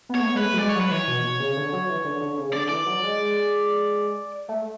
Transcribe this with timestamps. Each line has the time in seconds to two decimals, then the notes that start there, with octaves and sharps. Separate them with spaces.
0.09 B3
0.15 C#5
0.20 A3
0.26 B3
0.35 G#3 B4
0.43 A3
0.54 F#3
0.59 G#3 D5
0.69 C#5
0.75 F#3
0.81 B4
0.91 E3 C#5
1.07 B2
1.24 B2
1.40 C#3
1.57 D3
1.73 F#3
1.89 E3
2.04 D3
2.21 D3
2.38 C#3
2.53 D3 D5
2.69 E3 D5
2.86 F#3
3.03 G#3
4.48 A3